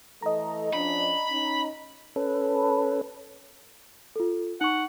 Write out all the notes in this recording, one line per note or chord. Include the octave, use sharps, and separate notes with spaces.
E3 A3 A4 D#5 A#5
F3 C#4 D4 B5
C#4 D#4
C#4 A4 B4
F4 A4
D#4 F#5 C#6